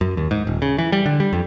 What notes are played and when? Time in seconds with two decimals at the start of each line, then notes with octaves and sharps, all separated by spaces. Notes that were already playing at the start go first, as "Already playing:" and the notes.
0.01 F#2
0.17 D#2
0.31 G#2
0.47 D#1
0.62 C#3
0.78 E3
0.92 G3
1.06 D3
1.20 G3
1.33 F2